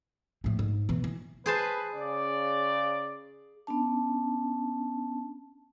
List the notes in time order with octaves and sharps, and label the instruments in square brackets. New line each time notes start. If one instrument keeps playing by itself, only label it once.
[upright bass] A2 F3
G#2
B2 E3
E3
[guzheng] G#4 C5 A5 [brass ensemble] B4
[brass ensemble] C#3 D5
[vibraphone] B3 C#4 D4 A5